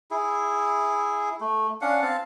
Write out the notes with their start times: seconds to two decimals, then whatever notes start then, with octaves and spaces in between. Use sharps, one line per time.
0.11 E4 G#4
1.41 A3
1.81 C#4 D4 F5 F#5
2.02 C4 F5 A5